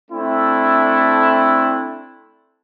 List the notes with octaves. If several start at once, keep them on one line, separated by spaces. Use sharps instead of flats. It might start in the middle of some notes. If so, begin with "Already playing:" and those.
A3 C4 D4 E4